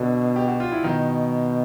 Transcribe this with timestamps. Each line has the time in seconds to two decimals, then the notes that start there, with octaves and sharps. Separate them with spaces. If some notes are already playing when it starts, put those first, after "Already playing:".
Already playing: B2 D3 D4
0.36 G4
0.48 F#4
0.60 F4
0.72 E4
0.84 B2 D#3 D#4